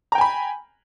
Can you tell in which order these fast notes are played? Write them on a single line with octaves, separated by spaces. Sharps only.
A#5 G5 G#5 B5